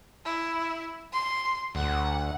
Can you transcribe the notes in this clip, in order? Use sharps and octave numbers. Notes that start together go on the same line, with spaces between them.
E4
C6
D2 F#5